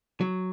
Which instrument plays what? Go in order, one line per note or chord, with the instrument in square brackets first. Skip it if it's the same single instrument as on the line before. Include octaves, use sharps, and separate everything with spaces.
[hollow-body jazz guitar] F#3